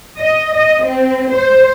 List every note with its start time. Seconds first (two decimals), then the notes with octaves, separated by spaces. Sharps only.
0.19 D#5
0.56 D#5
0.85 C4
1.33 C5